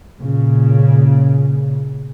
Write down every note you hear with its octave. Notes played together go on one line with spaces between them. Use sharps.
A#2 C#3